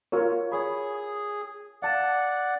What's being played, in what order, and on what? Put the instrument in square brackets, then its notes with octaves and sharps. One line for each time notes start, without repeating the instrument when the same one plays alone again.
[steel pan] F4 A#4 C#5
[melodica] G#4 [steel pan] C#5 B5
[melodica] D5 F#5 [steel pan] F5 A5